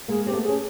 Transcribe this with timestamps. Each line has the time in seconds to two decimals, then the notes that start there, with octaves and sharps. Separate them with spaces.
0.08 G#3 A#3 G#4
0.26 C4 G4
0.33 A3 B3
0.44 C#4 G#4